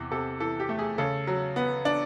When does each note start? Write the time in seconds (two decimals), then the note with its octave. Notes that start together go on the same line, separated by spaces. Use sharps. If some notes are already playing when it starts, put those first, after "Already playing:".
Already playing: E2 C3
0.11 C3 A4
0.40 E3 A4
0.60 G4
0.69 A3
0.79 G#4
0.98 C#3 A4
1.27 F#3
1.56 B3
1.85 D4